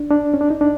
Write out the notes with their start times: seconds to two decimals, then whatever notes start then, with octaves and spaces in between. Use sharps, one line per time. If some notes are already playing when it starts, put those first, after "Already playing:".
Already playing: D4
0.10 D4
0.34 C#4
0.41 D4
0.50 D#4
0.61 D4